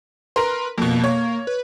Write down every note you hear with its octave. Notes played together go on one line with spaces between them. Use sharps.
A#4 B4 A#5 C6
F2 B2 A#3
C#5
B4